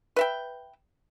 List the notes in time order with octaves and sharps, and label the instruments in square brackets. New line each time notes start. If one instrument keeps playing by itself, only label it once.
[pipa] B4 E5 G5